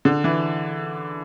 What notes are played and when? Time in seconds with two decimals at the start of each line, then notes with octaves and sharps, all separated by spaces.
0.05 D3
0.24 E3